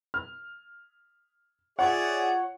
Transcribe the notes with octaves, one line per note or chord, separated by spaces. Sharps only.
F6
F4 G#4 C#5 D5 E5 F#5